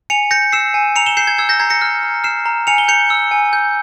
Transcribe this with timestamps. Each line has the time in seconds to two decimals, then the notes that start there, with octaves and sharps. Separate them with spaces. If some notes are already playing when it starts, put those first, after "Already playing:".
0.10 G#5 C#7 F7
0.31 G6 A#6 C#7
0.52 E6 C7 E7
0.74 G#5
0.96 A#5 C#7 F7
1.06 E7 G7
1.17 G6 C7 E7
1.27 G#6
1.38 E6 G#6
1.49 G6 A#6
1.60 A#5 G#6 C7
1.70 A#6 C#7
1.81 F6
2.03 A#5
2.24 F6 C7 E7
2.46 A#5
2.67 G#5 C#7 F7
2.78 G7
2.88 G6 C#7 F7
3.10 E6
3.31 G#5
3.53 G6